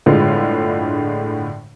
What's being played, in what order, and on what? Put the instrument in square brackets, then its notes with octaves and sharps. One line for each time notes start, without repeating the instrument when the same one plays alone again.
[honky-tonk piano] G1 A2 D3 G#3 F4